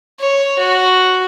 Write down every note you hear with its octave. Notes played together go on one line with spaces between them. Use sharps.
C#5
F#4